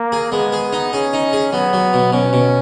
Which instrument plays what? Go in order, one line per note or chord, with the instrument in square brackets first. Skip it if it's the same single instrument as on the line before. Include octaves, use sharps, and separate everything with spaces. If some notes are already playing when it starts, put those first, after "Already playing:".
Already playing: [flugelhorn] A#3
[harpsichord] G#4
[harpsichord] G#3 [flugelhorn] B3
[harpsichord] G#4
D#4
[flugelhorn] C#4 [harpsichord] G#4
[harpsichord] D#4
G#4
[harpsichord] F#3 [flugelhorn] B3
[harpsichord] F#3
B2
[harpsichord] B2 [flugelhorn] C#4
[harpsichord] B2